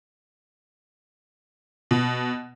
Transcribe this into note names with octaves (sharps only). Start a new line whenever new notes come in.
B2